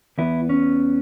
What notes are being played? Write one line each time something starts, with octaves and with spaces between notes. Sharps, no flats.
E2 E3 B3 E4
C#4